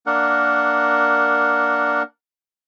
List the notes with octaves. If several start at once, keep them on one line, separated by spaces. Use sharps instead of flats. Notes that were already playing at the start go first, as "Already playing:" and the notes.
A#3 D4 A#4 F#5